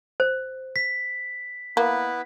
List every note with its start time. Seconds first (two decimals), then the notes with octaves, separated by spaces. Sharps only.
0.20 C5
0.76 B6
1.77 A#3 B3 E4 B4